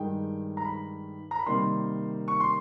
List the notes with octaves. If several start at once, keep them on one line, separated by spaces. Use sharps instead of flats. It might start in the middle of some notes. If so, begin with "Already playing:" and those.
Already playing: G2 D#3 G#3 G5
A#5
B5
A#5
B5
C3 D#3 G3 A#3 C6
C#6
C6